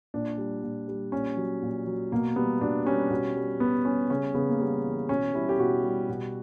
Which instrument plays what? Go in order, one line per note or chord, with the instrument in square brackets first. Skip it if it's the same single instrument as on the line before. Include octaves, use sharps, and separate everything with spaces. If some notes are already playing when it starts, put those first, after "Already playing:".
[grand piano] A#2 D4
G3
A#2
G3
A#2 C#4
F#3
A#2
F#3
B2 A#3
G3 B3
B2 D4
G3 C#4
B2
G3
B2 B3
G3 C#4
C#3 C#4
C#3 B3
A#3
G3 B3
E3
B2 C#4
G3 E4
G4
B2 F#4
G3
B2